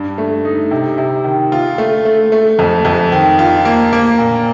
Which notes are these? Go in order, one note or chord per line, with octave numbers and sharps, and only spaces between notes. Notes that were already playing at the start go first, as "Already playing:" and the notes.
Already playing: G2
A3
D#4
C3
C3
D#3
F4
A3
A3
A3
F2
F2
D#3
F4
A#3
A#3
A#2